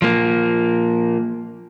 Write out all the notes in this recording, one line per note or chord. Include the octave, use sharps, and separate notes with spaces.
F3 A#3